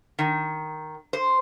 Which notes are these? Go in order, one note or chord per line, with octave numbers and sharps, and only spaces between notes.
D#3
C5